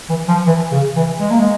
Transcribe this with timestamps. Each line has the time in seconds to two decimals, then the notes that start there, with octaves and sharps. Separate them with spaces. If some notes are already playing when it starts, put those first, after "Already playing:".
0.09 E3
0.28 F3
0.46 E3
0.72 C#3
0.96 E3
1.20 G#3
1.31 A#3
1.39 G#3